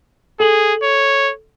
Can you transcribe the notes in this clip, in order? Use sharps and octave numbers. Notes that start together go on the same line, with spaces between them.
G#4 A4 F#7
C#5